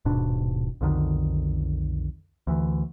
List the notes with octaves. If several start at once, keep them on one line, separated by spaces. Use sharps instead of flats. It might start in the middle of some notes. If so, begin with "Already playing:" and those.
D#1 G#2 B2 D4
B1 F2 D3 D#3
D2 E3